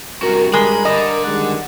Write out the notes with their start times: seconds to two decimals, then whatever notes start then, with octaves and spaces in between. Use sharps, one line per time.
0.22 C2 G2 G3 F#4 A#4
0.53 G#3 A#4 B5
0.85 D3 D#5
1.24 D#3 G3 G#3 F#5